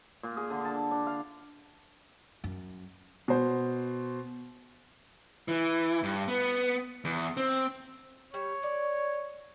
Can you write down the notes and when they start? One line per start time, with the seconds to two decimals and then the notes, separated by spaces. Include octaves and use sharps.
0.23 A#2
0.37 G#4
0.50 D3
0.65 A5
0.91 D4
1.07 F5
2.44 F#2
3.28 B2 C5
5.48 E3
6.03 G2
6.28 B3
7.05 E2
7.37 C4
8.34 G3 C#5
8.63 D5